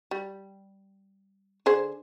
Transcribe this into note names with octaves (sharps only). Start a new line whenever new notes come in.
G3
D3 G#4 C5